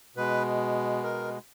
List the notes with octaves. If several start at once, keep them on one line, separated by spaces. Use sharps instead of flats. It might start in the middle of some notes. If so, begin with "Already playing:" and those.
B2 G#3 B4
A#4